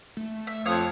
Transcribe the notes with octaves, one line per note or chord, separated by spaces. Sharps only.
A3
E5
F2 C#5 F5 D#6